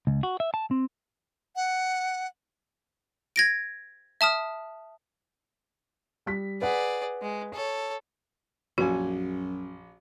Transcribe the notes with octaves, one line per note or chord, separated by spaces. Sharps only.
C#2
F#4
E5
A5
C4
F#5
G#6 A#6 D7
E5 A5 D#6 F6
G3 B6
G#4 B4 D5 F#5
G#3
A4 C#5
A#1 F#2 C#4 F#4 G#5